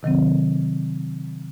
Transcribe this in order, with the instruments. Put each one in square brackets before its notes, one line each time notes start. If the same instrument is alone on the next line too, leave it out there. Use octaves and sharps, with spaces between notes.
[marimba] C3 D#3 F#3 C4